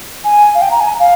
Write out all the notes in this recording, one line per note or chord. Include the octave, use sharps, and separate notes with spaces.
G#5
F5
G5
A#5
G#5
F5